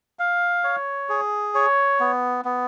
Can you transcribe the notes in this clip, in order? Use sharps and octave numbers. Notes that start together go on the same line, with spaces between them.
F5
C#5
G#4
C#5
B3
B3